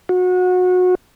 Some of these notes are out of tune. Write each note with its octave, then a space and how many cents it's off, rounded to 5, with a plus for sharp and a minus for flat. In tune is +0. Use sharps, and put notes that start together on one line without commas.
F#4 -25